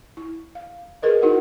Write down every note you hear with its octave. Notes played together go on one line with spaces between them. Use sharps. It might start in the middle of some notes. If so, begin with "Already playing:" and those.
E4
F5
G#4 A#4 B4 D#5
D#4 E4 F#4 A#4 F#5